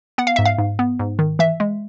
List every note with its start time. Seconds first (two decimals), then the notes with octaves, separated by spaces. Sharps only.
0.18 B3 F#5
0.27 F5
0.36 G#2 E5
0.46 F5
0.58 G#2
0.79 B3
0.99 G#2
1.19 D#3
1.39 E3 E5
1.60 G#3